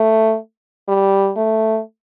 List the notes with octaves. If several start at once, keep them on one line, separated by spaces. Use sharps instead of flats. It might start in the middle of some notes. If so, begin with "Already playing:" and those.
Already playing: A3
G3
A3